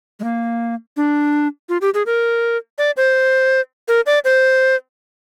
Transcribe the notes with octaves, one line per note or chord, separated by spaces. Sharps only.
G#3
A#3
D4
F4
G4
G#4
A#4
D5
C5
A#4
D5
C5